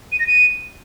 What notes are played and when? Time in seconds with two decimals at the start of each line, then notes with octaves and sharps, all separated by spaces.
0.12 D#7
0.20 A#6
0.27 D#7